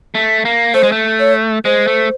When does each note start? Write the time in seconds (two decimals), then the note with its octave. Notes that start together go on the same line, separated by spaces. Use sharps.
0.15 A3
0.45 A#3
0.74 A3 C5
0.83 G#3
0.92 A3
1.19 C#5
1.65 G#3 C5
1.87 A3